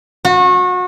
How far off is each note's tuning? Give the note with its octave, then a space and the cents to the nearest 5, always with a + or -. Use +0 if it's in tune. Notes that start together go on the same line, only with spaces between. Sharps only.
F#4 -30